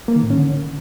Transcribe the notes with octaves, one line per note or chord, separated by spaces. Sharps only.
A#3
D#3
A2
C#4
D3